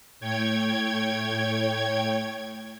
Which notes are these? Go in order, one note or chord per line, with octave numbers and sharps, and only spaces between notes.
A2 C#5 G5 G#6